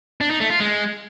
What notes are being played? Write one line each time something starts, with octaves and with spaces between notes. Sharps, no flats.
D4
D#4
A3
F4
G#3